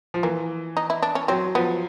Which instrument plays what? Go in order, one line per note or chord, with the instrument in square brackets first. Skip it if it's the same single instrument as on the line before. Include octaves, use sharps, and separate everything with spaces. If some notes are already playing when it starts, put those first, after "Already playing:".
[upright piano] F3
[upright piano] E3 [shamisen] A#3
[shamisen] D#4
E4
D4
C#4
[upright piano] F#3 [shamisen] C4
[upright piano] F3 [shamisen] B3